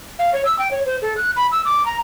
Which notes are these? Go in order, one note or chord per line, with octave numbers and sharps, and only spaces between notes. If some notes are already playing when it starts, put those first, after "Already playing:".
F5
C#5
E6
G5
C#5
C5
A4
F#6
B5
E6
D6
A#5